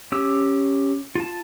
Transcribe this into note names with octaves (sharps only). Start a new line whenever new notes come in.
C#4 G4 E6
F4 A5